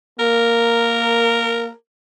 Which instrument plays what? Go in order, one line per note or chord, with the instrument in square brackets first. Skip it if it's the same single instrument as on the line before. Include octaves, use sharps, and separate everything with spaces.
[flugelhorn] A#3 [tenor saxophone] A#4